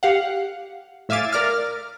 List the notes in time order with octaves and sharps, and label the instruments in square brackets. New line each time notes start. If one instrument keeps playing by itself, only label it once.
[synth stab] G4 F5 F#5
A2 E5 F5 G#5 D6 A6
A#4 D5 D6 F6